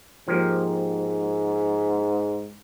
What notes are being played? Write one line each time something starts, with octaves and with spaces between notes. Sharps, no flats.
G#2 F3 A#3 G4